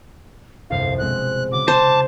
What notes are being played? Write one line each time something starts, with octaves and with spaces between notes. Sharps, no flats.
G1 C2 F2 F5
B2 G#3 C4 F#6
C#3 F#4 D6
C5 A5